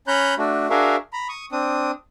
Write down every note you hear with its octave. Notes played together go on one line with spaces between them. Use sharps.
C#4 C#5 A#5 B5 F#6 G6
A3 D4 F#4
D4 F#4 G#4 A#4 E5 F5
A#5 B5
C#6 D#6
C4 D4 D#6